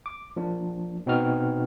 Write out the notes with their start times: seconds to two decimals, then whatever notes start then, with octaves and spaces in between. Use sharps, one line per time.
0.06 D6
0.36 F3 A#3 D4
1.06 B2 C4 D#4 F#4 B4 F6